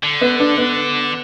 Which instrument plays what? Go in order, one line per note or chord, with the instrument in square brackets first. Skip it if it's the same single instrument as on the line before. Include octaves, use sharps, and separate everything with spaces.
[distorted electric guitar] D3
[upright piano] B3
D4
B3